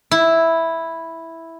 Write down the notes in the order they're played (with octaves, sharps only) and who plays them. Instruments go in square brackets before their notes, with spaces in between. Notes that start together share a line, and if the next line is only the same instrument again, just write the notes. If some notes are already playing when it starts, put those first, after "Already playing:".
[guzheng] E4